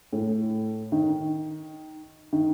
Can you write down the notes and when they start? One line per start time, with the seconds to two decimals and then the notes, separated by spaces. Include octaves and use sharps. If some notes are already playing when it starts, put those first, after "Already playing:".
0.13 A2
0.92 D#3
2.33 D#3